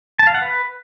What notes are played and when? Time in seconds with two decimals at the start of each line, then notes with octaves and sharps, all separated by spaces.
0.19 A5
0.27 F5
0.34 F#5
0.42 B4